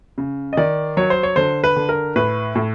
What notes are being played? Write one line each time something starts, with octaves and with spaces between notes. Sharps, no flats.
C#3
D#5
D#3 D5
F#3 C#5
C5
C#5
D3 C5
B4
D3
A#4
A2 B4
A2